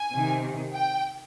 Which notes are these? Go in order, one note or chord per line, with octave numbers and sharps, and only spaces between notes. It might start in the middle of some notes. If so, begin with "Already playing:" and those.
Already playing: G#5
C3 D#3
G5